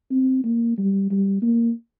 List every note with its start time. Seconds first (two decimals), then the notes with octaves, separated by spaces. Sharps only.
0.11 C4
0.44 A#3
0.78 G3
1.10 G3
1.42 A#3